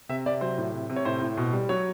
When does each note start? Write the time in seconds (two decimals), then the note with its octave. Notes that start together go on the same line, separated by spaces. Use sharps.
0.09 C3 E5
0.26 C3 D5
0.41 F#3 C5
0.58 A2
0.74 C3
0.90 C3
0.96 C#5
1.05 A2 C5
1.22 A2
1.37 B2
1.53 G3
1.69 F#3 C#5